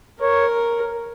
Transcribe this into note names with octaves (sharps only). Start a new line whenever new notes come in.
A#4 C#5